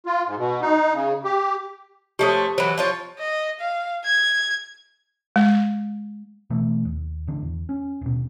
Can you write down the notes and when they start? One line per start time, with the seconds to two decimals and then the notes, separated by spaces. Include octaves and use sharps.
0.06 F4
0.26 G#2
0.37 B2
0.61 D#4
0.93 C#3
1.24 G4
2.19 F3 A3 C#4 G4 C5 D#6
2.58 E3 F#3 C5 B5
2.78 F3 F4 C#5
3.19 D#5
3.60 F5
4.05 G#6
5.36 G#3
6.50 B2 E3 A3
6.85 D#2
7.27 A1 D3
7.42 E2
7.69 C#4
8.01 D#1 B2